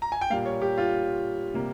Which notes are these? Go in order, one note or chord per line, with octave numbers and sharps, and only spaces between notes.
A#5
G#5
G5
A#2 G3 A#3 F5
C#5
G4
F4
C3 G3 A#3